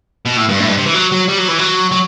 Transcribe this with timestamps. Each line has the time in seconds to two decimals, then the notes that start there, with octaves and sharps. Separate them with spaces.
0.26 B2
0.37 A2
0.49 G2
0.60 A2
0.68 G2
0.77 C3
0.86 E3
0.94 F#3
1.12 F#3
1.29 G3
1.38 F#3
1.48 E3
1.59 F#3
1.92 F#3